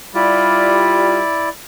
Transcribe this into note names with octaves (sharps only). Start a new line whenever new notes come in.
G3 E4 F4 D5